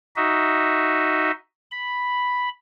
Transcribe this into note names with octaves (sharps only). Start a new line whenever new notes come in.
D#4 F#4 D#5 E5
B5